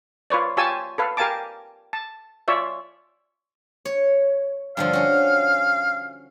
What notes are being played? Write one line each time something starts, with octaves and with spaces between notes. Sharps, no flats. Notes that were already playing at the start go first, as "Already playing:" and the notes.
F4 B4 C#5 D5
F4 G4 C#5 G#5 A5 E6
A4 B4 F5
G4 A#4 F5 G#5 A5 D6
A5
F4 C#5 D5 E5
C#5
G2 D3 F3 F5
C#4 F#4